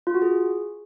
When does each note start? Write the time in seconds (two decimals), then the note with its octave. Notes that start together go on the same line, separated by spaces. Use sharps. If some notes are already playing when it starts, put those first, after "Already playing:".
0.07 F4
0.14 F#4
0.22 G#4